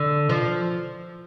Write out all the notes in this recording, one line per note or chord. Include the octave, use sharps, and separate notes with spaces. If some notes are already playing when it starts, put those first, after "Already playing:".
Already playing: D3
F3